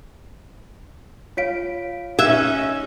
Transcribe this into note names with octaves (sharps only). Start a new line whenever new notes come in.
F4 C#5 F5 B6 D7
C#4 D#4 E5 F#6 G#6